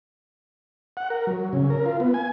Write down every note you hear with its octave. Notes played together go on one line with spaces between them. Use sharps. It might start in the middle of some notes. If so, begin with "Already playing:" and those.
F#5
A#4
F#3
C#3
A#4
F4
B3
G#5